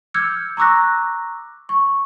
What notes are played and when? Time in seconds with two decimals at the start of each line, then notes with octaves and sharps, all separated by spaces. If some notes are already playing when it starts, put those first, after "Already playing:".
0.14 D6 E6 F6 G6 G#6 C#7
0.57 A#5 C#6 D6 E6 F#6 A#6
1.69 C#6